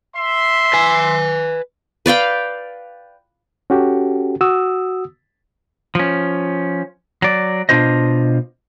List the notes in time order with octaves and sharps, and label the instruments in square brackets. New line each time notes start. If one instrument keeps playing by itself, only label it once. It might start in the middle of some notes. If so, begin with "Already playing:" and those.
[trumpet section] E5 C6
[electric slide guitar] B4 G#5
[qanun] B4 D5 F5 G5
[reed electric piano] C#4 F#4 G4 A4
F#4 D#6 E6
[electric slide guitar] F3 C#4
F#3 D5
B2 D4 F4 C5 D#5